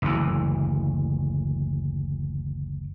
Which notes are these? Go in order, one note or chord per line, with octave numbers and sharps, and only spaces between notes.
F#1 D2 E3